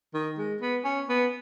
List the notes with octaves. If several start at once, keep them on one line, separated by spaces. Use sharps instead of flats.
D#3
G#3
B3
C#4
B3